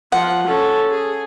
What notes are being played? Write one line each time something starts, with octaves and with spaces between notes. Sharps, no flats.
F3 F#5
C#4 A4
G#4